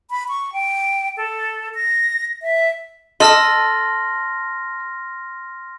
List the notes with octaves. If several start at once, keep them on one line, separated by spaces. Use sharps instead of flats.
B5
C#6
G5
A4
A#6
E5
A4 D#5 C6 F6 A#6